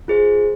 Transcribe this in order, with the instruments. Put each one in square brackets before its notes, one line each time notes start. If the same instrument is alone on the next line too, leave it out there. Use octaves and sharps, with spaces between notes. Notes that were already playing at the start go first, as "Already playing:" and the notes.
[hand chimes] F4 G#4 C5